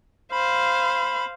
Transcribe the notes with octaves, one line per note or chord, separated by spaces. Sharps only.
C5 F5 B5